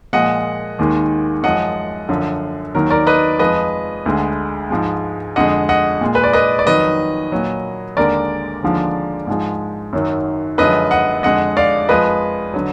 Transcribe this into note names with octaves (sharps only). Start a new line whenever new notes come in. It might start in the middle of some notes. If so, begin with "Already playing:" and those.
A#2 F3 G#3 D#5 F#5
D#2 D#3 G#3
F#2 F3 G#3 D#5 F#5
F#2 D3 F3
D#2 D#3 F#3 A#4
A#4 D5
B4 D#5
F2 F3 G#3 B4 D#5
D2 D3 G#3
G#2 F3 G#3
F2 D3 G#3 D#5 F#5
D#5 F#5
A#2 G#3
B4
D5
B4 D#5
D5
F2 D#3 F#3 B4 D#5
A#2 F#3
D#2 D3 G#3 A#4 D5
D#2 D3 F3 G#3
G#2 F3 G#3
F#2 D#3 F#3
F#2 D3 F3 G#3 B4 D#5
D#5 F#5
F2 D3 G#3 D#5 F#5
D5 F5
F2 F3 G#3 B4 D#5
D3 F#3